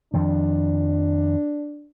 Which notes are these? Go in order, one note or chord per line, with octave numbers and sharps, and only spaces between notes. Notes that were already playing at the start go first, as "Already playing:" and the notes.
F2 D#3 F3 D4